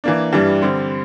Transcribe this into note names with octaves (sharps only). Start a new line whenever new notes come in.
E3 A#3 D4
G2 E3 G3 D4
D3 G3 C4